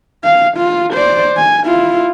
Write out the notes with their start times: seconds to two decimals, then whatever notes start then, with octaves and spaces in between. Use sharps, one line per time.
0.24 F5
0.57 F4
0.93 C5 D5
1.37 G#5
1.66 E4 F4